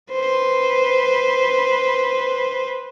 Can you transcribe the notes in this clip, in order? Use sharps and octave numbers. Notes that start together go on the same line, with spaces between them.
B4 C5